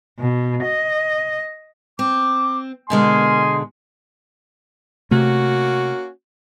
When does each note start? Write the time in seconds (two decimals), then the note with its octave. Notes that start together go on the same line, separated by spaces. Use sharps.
0.19 B2
0.64 D#5
1.99 C4 D6
2.90 B2 D3 G#3 A#4 D#5 G#5 C6
5.11 C3 A3 A#3 C#4 F#4